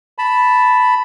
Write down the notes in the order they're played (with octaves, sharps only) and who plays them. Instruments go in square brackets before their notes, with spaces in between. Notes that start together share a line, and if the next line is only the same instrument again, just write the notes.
[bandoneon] A5 B5